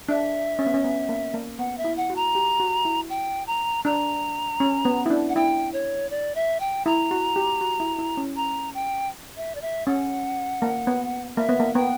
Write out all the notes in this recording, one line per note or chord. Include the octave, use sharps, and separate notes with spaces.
D4 E5
C#4
B3
C#4
B3
A#3
A#3
B3 F#5
E5
E4
F#5
F#4
A#5
G4
F#4
E4
G5
A#5
D4 A#5
C#4
B3
E4
D4
F#5
E4 G5
C#5
D5
E5
G5
E4 A#5
F#4
G4
F#4
E4
E4
C#4
A#5
G5
E5
D5
E5
C#4 F#5
A#3
B3
A#3 E5
B3
A#3
B3 G5